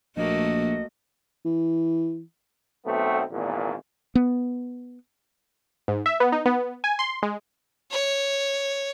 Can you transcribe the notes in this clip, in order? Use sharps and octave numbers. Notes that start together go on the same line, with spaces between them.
A#1 A3 A#3 F#4 D#5
E3
B1 A3 B3 C4
G#1 E2 A#2
B3
G#2
E5
B3
D#4
B3
G#5
C6
G#3
C#5